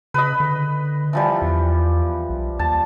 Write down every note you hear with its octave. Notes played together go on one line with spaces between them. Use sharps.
C#3 B4 D#5
D3
E3 F3 G3
E2
B1
D#2 A5